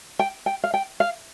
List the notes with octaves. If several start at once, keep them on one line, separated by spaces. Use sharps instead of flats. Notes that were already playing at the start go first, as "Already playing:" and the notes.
G5
G5
F5
G5
F5